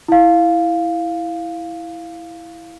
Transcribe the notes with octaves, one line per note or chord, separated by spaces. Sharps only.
E4 F5